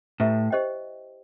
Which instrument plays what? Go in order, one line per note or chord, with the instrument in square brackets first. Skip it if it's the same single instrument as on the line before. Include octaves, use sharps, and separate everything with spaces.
[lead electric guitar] A2 [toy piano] E4 G4 B4 E5
[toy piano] G4 C5 D#5 G5